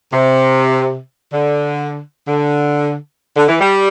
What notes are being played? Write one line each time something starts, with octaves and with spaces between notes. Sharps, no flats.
C3
D3
D3
D3
E3
G3